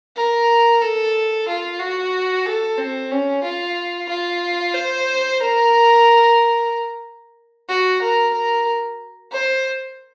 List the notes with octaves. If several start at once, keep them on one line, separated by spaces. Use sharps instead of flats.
A#4
A4
F4
F#4
A4
C4
C#4
F4
F4
C5
A#4
F#4
A#4
A#4
C5